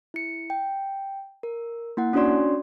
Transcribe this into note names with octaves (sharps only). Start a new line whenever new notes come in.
E4 C#7
G5
A#4
A#3 E4 F#5
C#4 D4 F#4 C#5 D5 C6